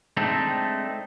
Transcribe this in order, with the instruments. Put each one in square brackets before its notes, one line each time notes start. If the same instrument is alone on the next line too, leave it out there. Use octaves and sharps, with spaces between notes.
[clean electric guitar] G#3 A3 C4 D4 D#4